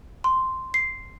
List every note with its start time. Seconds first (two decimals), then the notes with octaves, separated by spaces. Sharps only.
0.24 C6
0.74 C7